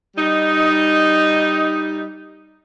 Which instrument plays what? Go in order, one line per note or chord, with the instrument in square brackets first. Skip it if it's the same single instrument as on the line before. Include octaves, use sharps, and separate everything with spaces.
[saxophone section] G3 D#4